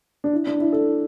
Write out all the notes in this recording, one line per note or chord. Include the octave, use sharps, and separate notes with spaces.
D4
E4
D4
E4
A4